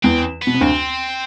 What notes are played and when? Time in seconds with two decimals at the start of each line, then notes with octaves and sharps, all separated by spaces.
0.04 E2 E3 C4
0.42 B3
0.47 B2
0.54 C3
0.61 D2 D3 C4